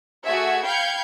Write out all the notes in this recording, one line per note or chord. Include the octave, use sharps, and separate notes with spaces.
A3 F#4 G#4 E5 G#6 C#7
F5 G5 B5 G6 G#6 C#7